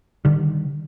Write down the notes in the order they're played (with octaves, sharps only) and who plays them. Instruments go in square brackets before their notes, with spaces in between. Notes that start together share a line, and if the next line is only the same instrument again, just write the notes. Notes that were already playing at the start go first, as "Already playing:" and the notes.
[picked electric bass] D3 D#3 G3